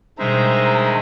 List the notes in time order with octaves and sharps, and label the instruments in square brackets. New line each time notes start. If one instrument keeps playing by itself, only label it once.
[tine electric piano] B2 G3 D4 [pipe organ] D#3 G#3 [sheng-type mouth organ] C5 E5 [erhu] A#5